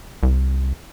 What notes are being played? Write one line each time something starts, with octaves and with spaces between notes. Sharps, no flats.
C2